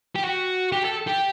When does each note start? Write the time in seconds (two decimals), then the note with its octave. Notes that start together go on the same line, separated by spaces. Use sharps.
0.15 G4
0.23 F#4
0.72 G4
0.85 A4
1.08 G4